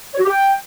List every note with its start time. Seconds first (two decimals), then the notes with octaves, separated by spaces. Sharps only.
0.14 C#5
0.19 F#4
0.24 G4
0.29 G5